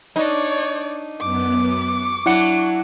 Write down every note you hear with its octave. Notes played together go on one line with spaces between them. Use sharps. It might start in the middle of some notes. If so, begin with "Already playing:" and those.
D4 D#4 C#5 D5
F#2 B3 D6
C#6
F#3 D4 E4 F#5 C#7